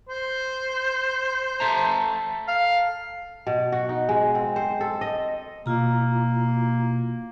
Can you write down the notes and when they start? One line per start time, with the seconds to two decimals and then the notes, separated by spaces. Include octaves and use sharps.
0.09 C5
1.60 A4 E5 A#5
2.48 F5
3.47 B2
3.72 F#4
3.89 D#4
4.09 G#3
4.35 C4
4.56 C5
4.81 A4
5.01 D#5
5.66 B2 A#3 E4 F4 A#5